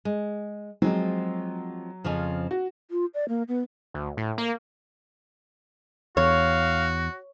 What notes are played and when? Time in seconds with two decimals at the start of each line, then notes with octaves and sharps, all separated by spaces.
0.05 G#3
0.82 F3 F#3 G#3 C4
2.04 F2 C#3 F3
2.51 F#4
2.91 F4
3.14 D5
3.29 A#3
3.48 B3
3.94 D2
4.17 A2
4.38 A#3
6.17 E2 F#4 C#5 F5